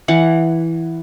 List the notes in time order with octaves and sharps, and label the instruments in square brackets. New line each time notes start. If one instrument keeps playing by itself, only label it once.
[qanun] E3 F#5